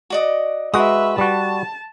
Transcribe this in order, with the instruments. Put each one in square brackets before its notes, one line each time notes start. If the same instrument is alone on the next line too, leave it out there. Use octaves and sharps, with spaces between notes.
[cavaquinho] F#4 D5 D#5
[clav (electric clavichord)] G#3 F#4 [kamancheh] B4 E5 [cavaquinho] D#6
[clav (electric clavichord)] G3 F#4 [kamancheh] A5